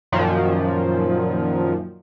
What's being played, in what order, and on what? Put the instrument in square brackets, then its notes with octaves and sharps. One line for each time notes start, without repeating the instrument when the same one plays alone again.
[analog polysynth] F#2 A#2 D#3 F3